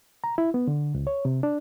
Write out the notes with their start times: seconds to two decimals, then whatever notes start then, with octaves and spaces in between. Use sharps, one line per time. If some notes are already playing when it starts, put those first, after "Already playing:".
0.24 A#5
0.38 E4
0.54 B3
0.67 D3
0.95 C#2
1.07 C#5
1.25 C3
1.43 D4